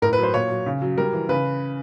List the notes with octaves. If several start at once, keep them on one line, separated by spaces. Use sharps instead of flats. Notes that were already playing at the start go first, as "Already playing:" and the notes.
A2 A#4
B4
F#3
C5
A#2 C#5
F#3
C#3
F#3
G3 A#4
E3
C#3 B4